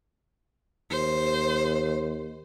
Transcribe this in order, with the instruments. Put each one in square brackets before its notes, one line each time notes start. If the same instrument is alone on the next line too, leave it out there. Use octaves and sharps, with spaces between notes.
[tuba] D#2 [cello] C5